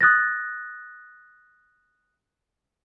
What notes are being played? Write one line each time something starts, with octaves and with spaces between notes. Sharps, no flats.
D#6 F#6 A6 A#6